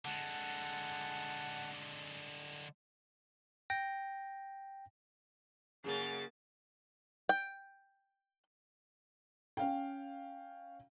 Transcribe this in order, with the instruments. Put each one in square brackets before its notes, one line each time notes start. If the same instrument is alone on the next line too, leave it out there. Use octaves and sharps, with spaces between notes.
[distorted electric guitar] D3 G#3 [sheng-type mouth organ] F#5 A5
[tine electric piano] G5 A#6
[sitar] F#2 C#3 [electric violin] A#3 A6 [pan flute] G#4
[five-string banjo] G5
[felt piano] C#4 F5 G5